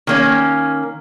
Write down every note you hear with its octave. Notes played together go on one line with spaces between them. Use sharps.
D#3 A#3 C#4